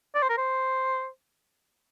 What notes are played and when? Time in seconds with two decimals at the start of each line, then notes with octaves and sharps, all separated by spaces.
0.15 D5
0.23 C5
0.30 A#4
0.38 C5